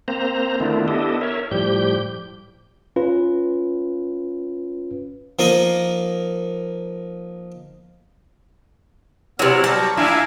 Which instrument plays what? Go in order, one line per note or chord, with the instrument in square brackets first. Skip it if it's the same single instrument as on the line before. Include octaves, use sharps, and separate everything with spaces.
[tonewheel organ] A#3 C4 C5 A#5
D#3 A3 B3 D4 E4 F4
B3 D4 E4 G4 A4 D#5
A#4 C#5 E5
A2 F3 G3 G4 G6
[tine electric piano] C#4 F4 B4
[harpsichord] F3 A#3 D#4 D#5
[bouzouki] C3 F#3 [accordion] B3 [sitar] E4 [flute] F6
[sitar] F#3 G3 [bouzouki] A5 [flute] A#5 [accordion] C#6
[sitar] A2 D4 E4 [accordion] E5 F5 G#5